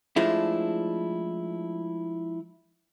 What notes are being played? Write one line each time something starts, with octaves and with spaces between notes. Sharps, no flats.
F3 G#3 A3 D4 E4